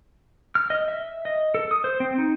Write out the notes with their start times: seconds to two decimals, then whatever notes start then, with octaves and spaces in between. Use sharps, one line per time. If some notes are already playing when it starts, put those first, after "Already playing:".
0.55 F6
0.70 D#5
0.88 E5
1.25 D#5
1.54 A4
1.71 D#6
1.84 C5
2.00 C4
2.18 D#4